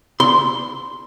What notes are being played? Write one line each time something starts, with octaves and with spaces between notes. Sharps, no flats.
C6